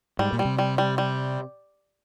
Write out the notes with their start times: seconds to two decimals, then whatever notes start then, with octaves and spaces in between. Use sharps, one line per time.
0.19 G#2 G3
0.33 A#2
0.39 G3
0.45 C3
0.59 G3
0.78 G3
0.98 G3